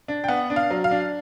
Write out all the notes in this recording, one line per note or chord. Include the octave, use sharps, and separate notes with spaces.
D4
G5
B3 F#5
D4
F5
F#3
F5
D4